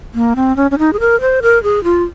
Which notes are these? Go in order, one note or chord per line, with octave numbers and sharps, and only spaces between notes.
A#3
C4
C#4
C#4
D#4
G#4
A#4
C5
A#4
G#4
F4